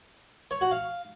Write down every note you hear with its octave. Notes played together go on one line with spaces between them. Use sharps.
C#5
F#4
F5